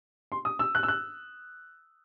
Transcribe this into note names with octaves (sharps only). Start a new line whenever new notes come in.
C6
D#6
E6
F#6
E6
F#6